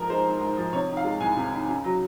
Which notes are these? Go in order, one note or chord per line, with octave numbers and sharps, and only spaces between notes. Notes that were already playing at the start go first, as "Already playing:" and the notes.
Already playing: G#2 F3 A#4
G#3 C5
G#1
G#2
F3
C3 C#5
D#3
F5
G#3
C2 G#5
C3
D#3
C#3
F#3